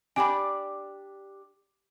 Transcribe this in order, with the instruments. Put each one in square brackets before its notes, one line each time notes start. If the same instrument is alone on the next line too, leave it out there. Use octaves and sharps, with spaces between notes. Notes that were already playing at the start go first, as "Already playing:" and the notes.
[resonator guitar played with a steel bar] D4 G4 D5 [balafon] G#5 B5